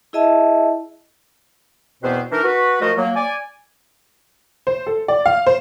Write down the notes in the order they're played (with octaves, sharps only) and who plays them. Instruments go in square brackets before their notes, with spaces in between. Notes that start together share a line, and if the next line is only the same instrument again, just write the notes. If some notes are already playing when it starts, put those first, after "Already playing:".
[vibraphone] E4 G#4 D#5 E5 A5
[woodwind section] E2 B2 B3 C4 B4 C5
E3 D4 D#4 A#4
F#4 B4
F3 A3 F4 F#4 A#4 D#5
F#3 A#3
D5 G#5
[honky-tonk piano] C5
A4
D5
F5
C5